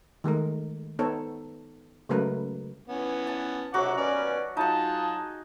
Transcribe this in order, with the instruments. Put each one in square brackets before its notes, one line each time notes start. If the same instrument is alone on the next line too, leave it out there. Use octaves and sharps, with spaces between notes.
[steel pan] D#3 G#3 A3 A#4
B3 D#4 A4 C5 C#5
C#3 F#3 G#3 A3 A#4 B4
[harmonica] E3 B3 C#4
[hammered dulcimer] A5
[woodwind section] C#2 G#2 C3 [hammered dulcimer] F#3 F#4 [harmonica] F#5 D6
[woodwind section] D#2 B2 C#4 [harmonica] D5
[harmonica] F#3 F4 [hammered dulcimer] D#4 G#4 [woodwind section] A5